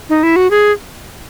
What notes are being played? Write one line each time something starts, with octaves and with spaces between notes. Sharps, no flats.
D#4
E4
F#4
G#4